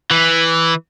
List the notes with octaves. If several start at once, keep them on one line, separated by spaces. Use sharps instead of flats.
E3